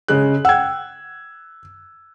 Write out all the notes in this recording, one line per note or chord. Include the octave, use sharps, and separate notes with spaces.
C#3 G#3 F#6
F#5 G5 E6 G#6